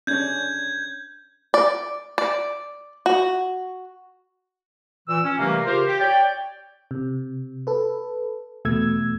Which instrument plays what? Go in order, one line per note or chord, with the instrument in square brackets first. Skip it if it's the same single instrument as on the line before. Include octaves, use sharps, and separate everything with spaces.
[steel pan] C#4 D4 C#5 [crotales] G6 G#6
[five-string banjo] D5
D5
F#4
[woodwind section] A#2 E3 E6
C#4
C3 E3 G3 A3 A#3
C#3 F4 G4 A#4 C5
G4
C#5 D5 G5
[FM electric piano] C3
A4 B4
E2 B2 A3 E6 G#6